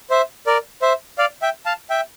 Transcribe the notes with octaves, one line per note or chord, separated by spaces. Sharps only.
C5 E5
A#4 D5
C5 E5
D5 F5
E5 G5
F5 A5
E5 G5